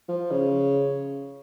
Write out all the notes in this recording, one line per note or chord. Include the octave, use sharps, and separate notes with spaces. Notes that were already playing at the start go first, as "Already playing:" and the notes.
F3
C#3